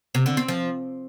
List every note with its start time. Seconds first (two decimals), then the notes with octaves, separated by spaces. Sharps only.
0.15 C3
0.26 D3
0.37 C4
0.48 F3